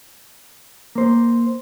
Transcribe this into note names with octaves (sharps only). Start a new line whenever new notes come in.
A#3 C5